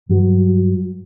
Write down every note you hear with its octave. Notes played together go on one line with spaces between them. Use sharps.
G2 F#3